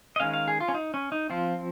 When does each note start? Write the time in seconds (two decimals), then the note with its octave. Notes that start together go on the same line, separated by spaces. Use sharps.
0.16 D#5
0.20 D#3 G#3 C#4 F5
0.34 F5
0.48 G#4
0.60 F4
0.68 C#4
0.74 D#4
0.94 C#4
1.12 D#4
1.30 F3 C4 F4